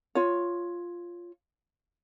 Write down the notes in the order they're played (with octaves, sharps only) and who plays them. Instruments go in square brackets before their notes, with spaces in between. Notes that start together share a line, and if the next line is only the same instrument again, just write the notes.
[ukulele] F4 C#5